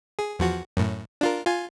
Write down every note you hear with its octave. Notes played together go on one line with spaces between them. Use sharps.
G#4
E2 F3 F#4
F#2 A2
D4 F4 A#4
F4 G#5